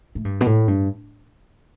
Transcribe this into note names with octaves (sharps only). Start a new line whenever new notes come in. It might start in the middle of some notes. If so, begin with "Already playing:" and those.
A2
G2
B2
A2
G2